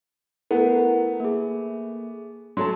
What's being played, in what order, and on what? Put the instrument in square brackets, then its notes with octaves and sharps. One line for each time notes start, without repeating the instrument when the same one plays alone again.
[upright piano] A3 B3 [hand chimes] E4 A#4 F#5
[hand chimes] A#3 G#4
[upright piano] F#3 A3 A5 [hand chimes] C6